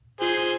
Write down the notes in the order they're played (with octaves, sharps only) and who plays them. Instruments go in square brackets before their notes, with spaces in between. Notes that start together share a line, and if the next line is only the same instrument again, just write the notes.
[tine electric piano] F4 [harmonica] G#4 C5